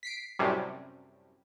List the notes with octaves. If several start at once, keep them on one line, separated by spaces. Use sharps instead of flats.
B6 C7 D7
F#2 A2 C3 G3